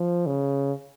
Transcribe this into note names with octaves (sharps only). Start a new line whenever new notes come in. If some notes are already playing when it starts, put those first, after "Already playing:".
Already playing: F3
C#3